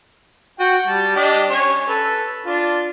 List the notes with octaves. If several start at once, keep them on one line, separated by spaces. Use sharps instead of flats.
F#4 G5
G3 A5
D4 G4 D#5
C#4 C#5
A4 B4
D4 F4